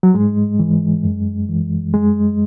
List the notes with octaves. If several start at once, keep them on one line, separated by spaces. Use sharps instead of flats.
F#3
G#2 G#3
E3
F#2
E3
F#2 G#3